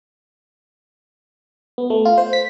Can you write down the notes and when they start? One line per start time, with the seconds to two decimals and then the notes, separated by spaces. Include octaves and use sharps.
1.78 B3
1.90 A3
2.05 F4
2.18 C5
2.33 B6